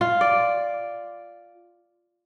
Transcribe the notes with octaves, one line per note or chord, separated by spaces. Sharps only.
F4
D5